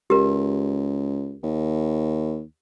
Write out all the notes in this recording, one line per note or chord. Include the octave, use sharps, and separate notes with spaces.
C#2 G4 A#4
D#2